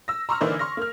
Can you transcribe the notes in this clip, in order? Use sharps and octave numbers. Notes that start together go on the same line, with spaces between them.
E6 A#6
A#5 C6 C#6 E6 F6
D3 E3 A#3 D#4 C5 D5
C6 C#6 F6 A#6
A#3 F6